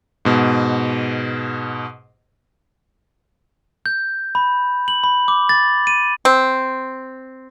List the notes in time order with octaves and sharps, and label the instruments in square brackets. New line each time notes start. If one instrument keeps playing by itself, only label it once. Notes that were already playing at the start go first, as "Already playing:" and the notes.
[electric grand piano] G#2 B2
[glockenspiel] G6
B5
F#7
B5
D6
A6
D#7
[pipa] C4